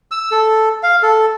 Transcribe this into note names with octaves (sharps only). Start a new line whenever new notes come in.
E6
A4
F5
A4